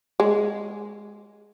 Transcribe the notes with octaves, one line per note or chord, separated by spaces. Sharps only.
G#3